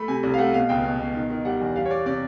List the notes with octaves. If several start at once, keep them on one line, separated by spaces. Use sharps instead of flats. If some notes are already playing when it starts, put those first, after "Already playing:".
Already playing: A3 B5
C3 G#5
C2
F5
A3 F#5
B2 F5
C#2 G5
B2
B2
D#3
D#3
G3 F#5
E2
G3 F5
C#5
G3 D5
C3 D5